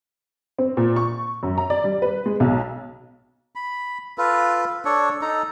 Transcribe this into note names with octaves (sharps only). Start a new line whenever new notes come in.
C4
A#2
C#6
F#2
A#5
D5
G3
B4
G#3
B1
B5
F4 A4 B4
D4 A4 C#5
D#4 A4 A#5